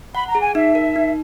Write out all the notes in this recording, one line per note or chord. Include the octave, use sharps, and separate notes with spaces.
F#5 B5
A#5
G#4
G#5
D#4 E5
A#4
D#4